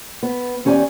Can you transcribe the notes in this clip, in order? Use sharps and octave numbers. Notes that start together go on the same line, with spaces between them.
B3
E2 C#4 G4 D5 G#5